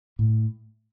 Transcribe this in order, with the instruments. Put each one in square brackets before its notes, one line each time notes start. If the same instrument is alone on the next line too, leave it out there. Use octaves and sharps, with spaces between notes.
[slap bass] A2